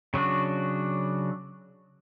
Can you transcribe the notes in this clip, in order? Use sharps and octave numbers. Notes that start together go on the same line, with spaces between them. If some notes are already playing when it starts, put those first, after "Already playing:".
C#3 F#3 D4 F#4